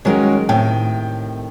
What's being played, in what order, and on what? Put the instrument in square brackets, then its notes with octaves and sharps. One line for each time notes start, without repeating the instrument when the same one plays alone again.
[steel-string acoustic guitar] D#3 A#4 [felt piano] F#3 G#3 C#4
[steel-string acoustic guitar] A2 C3 D#3 [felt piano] G5